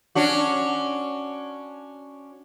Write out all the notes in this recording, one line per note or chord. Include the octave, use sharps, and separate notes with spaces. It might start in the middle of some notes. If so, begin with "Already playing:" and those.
C#4 D4 F#4